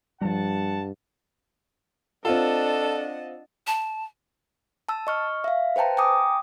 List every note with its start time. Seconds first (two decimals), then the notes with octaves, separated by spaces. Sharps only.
0.21 G2 F3 G3 F#5 A5
2.25 C4 D4 F4 A4 D#5 F#5 A5
3.67 A5
4.89 A5 E6
5.07 D#5 C#6 F6
5.44 E5 F5
5.76 B4 C5 G5 A5 A#5
5.97 G5 G#5 A#5 D6 D#6